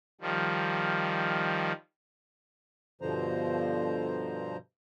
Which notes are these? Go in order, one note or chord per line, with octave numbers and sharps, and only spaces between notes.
D#3 F3 G3
G2 B2 D3 F3 C5 A#5